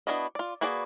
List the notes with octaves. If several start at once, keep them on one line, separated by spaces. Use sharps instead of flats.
B3 D4 E4 F#4 D#5
F4 D5
A#3 F#4 G#4 B4 D5